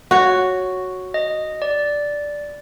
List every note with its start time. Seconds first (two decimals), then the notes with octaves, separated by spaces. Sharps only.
0.11 F#4 C#5
1.14 D#5
1.62 D5